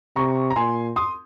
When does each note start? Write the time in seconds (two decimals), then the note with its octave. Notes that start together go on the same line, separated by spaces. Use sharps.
0.16 C3 A#5 C#6
0.50 A#5
0.56 A#2 G#5 C6
0.96 C6 D#6